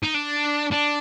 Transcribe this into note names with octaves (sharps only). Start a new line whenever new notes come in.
D#4
D4
D4